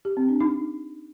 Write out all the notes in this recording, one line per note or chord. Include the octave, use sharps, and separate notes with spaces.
G4
C4
D4
D#4